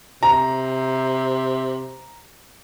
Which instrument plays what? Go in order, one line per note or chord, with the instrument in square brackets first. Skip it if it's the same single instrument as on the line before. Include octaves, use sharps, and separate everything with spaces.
[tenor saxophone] C3 [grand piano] A#5